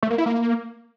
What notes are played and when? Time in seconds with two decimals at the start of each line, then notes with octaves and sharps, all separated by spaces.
0.03 A3
0.10 A#3
0.18 E4
0.26 A#3